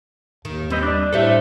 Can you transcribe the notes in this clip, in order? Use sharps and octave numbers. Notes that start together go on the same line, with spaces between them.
D#2 D#3
G3 C4 B4 D#5
D4 D5
A2 G4 A4 C5 E5